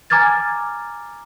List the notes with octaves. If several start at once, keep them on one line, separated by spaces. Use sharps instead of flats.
G#5 A#5 D6 F6 G#6 A6